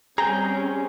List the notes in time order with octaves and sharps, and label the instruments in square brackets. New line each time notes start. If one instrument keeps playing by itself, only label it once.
[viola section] G3 C4 C#4 [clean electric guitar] G#4 G5 [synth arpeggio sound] A#5